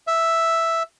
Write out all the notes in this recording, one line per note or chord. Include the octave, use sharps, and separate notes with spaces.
E5